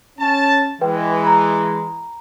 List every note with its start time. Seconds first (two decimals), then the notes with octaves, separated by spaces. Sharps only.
0.19 C#4 A5
0.81 E3 G#3 B4 G5
1.23 A#5 B5